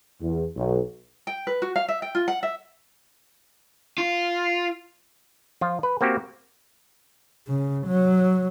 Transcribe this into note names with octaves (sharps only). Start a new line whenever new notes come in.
E2
B1
G5
B4
F#4
F5
E5
G5
F4
F#5
E5
F4
F3 F4
B4
A#3 C4 F#4 G4
C#3
F#3